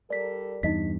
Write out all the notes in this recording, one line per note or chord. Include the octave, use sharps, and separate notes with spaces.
G3 A4 A#4 D5 B6
E2 G2 D#4 D#5 B6